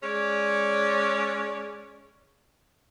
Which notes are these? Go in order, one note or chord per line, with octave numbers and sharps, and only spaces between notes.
G#3 C#4 C#5 D5